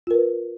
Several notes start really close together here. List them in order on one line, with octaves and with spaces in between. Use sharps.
F4 A#4 B4